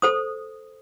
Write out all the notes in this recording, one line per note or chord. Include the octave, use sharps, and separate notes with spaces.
A4 C5 D#6